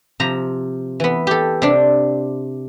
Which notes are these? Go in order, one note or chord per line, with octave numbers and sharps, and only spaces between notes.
C3 F3 A#5
E3 B3
G4 A4
C3 D4